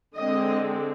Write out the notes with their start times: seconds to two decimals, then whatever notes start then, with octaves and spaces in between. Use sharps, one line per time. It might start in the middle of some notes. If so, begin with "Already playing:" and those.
0.17 D3 G#3 C4 D#5